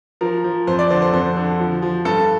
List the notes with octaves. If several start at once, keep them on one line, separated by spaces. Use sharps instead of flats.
F3 A#4
F3
F2 C5
D5
D3 C5
C5
F2 C5
D3
F3
F3
G2 A4